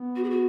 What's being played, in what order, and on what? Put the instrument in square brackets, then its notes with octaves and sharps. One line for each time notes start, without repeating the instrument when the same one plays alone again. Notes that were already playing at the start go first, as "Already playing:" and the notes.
Already playing: [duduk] B3
[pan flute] F#4
G#4
F#4